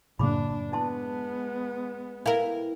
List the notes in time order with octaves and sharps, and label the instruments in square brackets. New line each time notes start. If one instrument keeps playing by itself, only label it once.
[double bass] F#2 D4 [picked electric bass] A2 C#3 A#3 [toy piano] B5 D6
[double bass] G#3 B3 [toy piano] E4 A5 C6
[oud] E4 A#4 [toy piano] B4 F5 G5